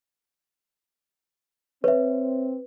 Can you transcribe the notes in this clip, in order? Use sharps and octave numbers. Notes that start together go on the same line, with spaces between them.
C4 B4 C#5 E5